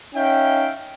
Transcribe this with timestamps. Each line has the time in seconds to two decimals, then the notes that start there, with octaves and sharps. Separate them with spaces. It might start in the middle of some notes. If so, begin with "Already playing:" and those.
0.15 C#4 D#4 E5 F5 G5